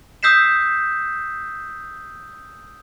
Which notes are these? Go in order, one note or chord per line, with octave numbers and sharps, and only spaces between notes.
D#6 E6 G6 B6 C7 E7